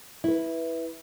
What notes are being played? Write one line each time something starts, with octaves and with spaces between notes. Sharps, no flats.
E4 B4